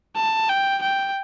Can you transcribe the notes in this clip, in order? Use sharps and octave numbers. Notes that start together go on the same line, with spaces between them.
A5
G5
G5